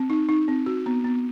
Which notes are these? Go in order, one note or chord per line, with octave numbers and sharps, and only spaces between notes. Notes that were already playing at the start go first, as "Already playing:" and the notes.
Already playing: C4
D#4
D#4
C4
F#4
B3
B3